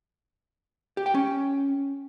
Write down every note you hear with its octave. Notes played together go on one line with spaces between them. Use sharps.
G4
G5
C#4